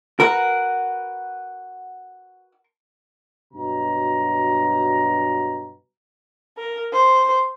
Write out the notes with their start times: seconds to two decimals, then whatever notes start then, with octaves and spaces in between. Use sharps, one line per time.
0.20 F#4 A#4 B4 F#5
3.54 G2 B2 F#3 A#5
6.57 A#4
6.93 C5